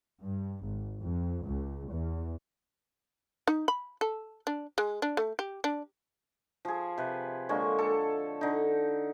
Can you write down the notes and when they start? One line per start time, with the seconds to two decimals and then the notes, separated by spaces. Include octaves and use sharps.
0.22 G2
0.65 G#1
1.02 F2
1.46 C#2
1.91 E2
3.48 D#4
3.68 B5
4.01 A4
4.47 D4
4.78 G#3
5.02 D4
5.17 A3
5.39 G4
5.64 D4
6.65 F3 G#4
6.98 C3 B4
7.49 D3 G#3 A#3 C#5
7.79 A4
8.41 D3 D#4